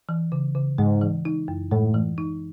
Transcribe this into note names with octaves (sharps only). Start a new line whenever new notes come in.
E3
C#3
C#3
G#2 G#3
E3
D#4
F#2
A2 G#3
E3
D#4